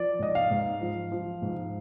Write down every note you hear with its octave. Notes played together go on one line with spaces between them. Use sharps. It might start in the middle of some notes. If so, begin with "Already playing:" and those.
Already playing: F3 D5
G#2 D#5
F5
G#2
F3
F3
G#2